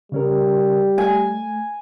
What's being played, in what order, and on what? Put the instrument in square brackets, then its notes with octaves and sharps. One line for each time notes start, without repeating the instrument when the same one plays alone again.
[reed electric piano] C#3 C#4 A#4 [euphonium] G3
[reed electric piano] A3 [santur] G#5